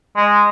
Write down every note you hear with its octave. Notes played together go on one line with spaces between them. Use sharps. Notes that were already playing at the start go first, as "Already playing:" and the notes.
G#3